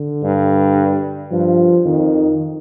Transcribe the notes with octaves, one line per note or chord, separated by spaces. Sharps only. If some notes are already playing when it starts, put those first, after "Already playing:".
Already playing: D3
G2
G2 F3
F2 D#3